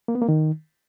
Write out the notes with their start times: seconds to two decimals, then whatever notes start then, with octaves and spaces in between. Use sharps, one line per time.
0.08 A#3
0.15 B3
0.22 A#3
0.29 D#3